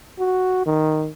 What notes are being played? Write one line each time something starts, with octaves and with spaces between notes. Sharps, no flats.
F#4
D#3